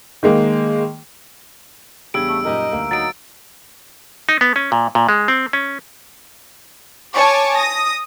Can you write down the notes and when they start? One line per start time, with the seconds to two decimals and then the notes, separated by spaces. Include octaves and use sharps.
0.23 D#3 G#3 A#3
2.14 E2 C#3 G3 D4 G4 E6 G#6 D7
2.28 A3 E6
2.45 F#2 A#2 D#4 G4 A#4 D#5
2.73 D2 A#3
2.91 F#3 D#4 A6 D7
4.29 D#4
4.41 B3
4.56 C#4
4.72 A#2
4.95 A#2
5.09 G#3
5.28 C4
5.53 C#4
7.13 C#5 G#5 A5 C#6 D6
7.56 D#6 A#6